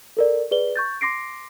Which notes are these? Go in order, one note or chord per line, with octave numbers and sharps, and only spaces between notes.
A4 A#4 D5
G#4 B4 D5 G7
C#6 G6 A6
C6 D6 A#6 C7 D7